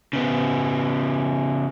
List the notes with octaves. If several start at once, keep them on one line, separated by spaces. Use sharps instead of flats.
C#3 B3